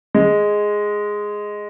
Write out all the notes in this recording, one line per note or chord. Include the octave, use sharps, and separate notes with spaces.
G#3